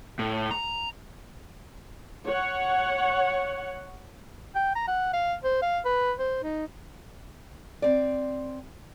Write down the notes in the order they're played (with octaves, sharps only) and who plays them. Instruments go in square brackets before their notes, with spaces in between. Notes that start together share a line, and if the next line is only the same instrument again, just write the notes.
[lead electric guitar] A2
A#5
[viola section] C#5 F#5
[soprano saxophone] G5
A#5
F#5
F5
C5
F5
B4
C5
D#4
[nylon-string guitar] C4 D5